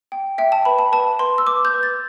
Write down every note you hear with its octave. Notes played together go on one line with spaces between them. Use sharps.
G5
E5 G5
A5
B4 B5
A5
B4 A5
B4 C6
E6
B4 D6
G6
B4
A6